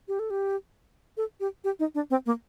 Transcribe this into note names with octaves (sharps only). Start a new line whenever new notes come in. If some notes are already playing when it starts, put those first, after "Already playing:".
G4
A4
G4
A4
G4
G4
D#4
D4
C4
A#3